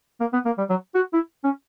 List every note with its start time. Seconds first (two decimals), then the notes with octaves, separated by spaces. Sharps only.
0.20 A#3
0.33 B3
0.45 A#3
0.58 G3
0.70 F#3
0.95 F#4
1.14 E4
1.44 C#4